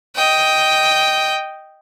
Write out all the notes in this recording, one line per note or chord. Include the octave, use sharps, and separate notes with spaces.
D#5 G5